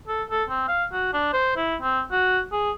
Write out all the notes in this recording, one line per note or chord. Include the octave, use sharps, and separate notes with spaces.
A4
A4
C4
F5
F#4
D4
C5
E4
C4
F#4
G#4